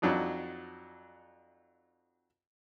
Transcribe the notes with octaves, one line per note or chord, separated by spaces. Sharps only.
F2 F#3 D4 D#4